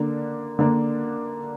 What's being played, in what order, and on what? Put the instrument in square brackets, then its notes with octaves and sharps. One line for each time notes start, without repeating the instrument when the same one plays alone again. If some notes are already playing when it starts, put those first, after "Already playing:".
Already playing: [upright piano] D3 A#3 D4
D3 A#3 D4